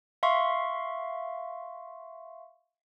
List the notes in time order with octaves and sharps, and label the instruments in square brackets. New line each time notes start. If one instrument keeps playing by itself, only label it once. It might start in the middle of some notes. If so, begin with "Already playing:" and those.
[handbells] E5 F5 C6 C#6